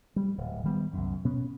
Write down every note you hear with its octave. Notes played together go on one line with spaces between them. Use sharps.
G3
D1
D#3 G3 B3
C2 F#2
B2 B3 C#4